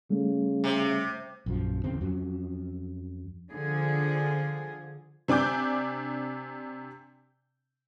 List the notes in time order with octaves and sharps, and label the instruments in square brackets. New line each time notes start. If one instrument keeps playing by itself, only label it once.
[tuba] C#3 [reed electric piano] G3 A3
[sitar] C3
[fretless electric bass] A#1 F#2 F3
D1 E2 C#3 C4
F2 F#3 C#4
[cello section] D3 F3 G#4
[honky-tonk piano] C3 D4 G#5 D6 G6